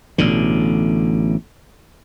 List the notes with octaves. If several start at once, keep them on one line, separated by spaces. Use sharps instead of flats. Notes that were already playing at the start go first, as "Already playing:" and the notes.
A1 B2 D3